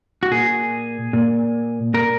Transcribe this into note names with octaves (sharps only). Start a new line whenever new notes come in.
F#4
A#2 G#4
A#2
A#2 A#4